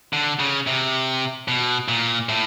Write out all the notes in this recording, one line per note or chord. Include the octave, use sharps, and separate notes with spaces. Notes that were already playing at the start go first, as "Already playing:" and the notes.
D3
C#3
C3
B2
A#2
A2